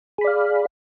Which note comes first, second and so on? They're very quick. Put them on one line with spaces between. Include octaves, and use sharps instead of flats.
G#4 B5 D5 F5